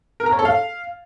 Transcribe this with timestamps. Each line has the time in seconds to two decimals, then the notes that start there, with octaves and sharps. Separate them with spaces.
0.20 A#4
0.26 A#5
0.32 C#5
0.39 A4
0.45 F5